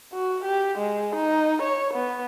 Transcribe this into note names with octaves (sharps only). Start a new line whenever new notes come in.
F#4
G4
G#3
D#4
C#5
B3